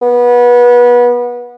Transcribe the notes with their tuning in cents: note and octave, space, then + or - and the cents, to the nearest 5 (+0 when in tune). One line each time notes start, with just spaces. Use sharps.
B3 -25